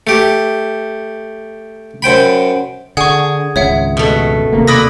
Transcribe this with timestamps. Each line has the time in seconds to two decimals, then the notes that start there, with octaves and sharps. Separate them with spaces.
0.07 A3 G4
2.02 F#2 C5 G5 B5
2.97 D3 G#4 F#5 C#6
3.56 G#1 C#2 C#5 E5 F#5
3.97 B2 A3
4.53 D#2 C3 A#3
4.67 E4 B4 D5 B5 D#6 A#6